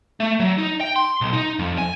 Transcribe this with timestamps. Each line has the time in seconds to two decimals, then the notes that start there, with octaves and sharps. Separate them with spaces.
0.20 A3
0.40 F#3
0.58 D#4
0.81 G5
0.96 C6
1.21 B1
1.33 D#4
1.59 F2
1.78 G#5